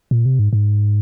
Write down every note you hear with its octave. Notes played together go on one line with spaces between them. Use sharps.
A#2
C3
G#2
G#2